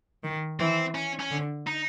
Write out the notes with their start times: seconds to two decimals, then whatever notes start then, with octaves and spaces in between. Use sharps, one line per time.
0.24 D#3
0.60 E3 C4
0.95 C#4
1.20 C#4
1.31 D3
1.67 D#4